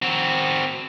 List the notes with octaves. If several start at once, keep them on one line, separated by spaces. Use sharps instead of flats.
C4 F#4